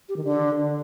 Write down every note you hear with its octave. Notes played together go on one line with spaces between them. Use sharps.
G4
D#3
D3